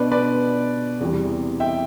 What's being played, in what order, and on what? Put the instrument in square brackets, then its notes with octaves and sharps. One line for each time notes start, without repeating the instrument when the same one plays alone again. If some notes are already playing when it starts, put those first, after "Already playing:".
Already playing: [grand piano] B2 B3 D4 B4 D5
B4 D5
E2 C3 E3 G3 C4
E5 G5